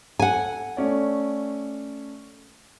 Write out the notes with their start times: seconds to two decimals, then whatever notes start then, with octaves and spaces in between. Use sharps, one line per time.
0.19 A4 F#5 G#5
0.77 A3 C#4 D5